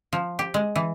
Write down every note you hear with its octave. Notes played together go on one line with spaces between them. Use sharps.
F3
G4
G#3
E3